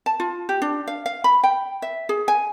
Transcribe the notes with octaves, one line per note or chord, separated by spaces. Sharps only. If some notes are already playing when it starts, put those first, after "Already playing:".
A5
F4
G4
D4
F5
F5
B5
G5
E5
G#4
G#5